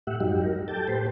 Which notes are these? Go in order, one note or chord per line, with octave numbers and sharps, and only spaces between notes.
A2 G4 E5 F#5
F#2 F#3 G3 D#4 G4
A#4
G4 A4 G5 A5
A2 G4 B4 C5